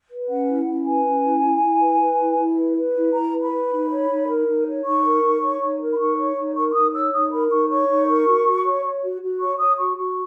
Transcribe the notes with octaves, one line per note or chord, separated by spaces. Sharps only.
B4
C#4 F#5
E4
C#4
B4 G#5
C#4
E4
E4
E4
B4
B4
E4
E4
B4
B4
E4
E4 A#5
B4
B5
B4
D#4
C#5
D#4
A#4
D#4
C#5
D#4 C#6
A#4
D#4
C#5
D#4
A#4
B5
D#4 C#6
C#5
D#4
A#4 C#6
C#6
D#4 D#6
C#5 E6
D#4 D#6
A#4 B5
D#4 C#6
C#5 C#6
D#4
A#4
F#4
F#4
C#5
C#5
F#4
F#4
C#5 C#6
C#5 D#6
F#4 C#6
F#4 C#6